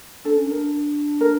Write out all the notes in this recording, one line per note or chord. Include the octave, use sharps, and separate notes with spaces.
D4 A4
C#4
D4 A#4
A#4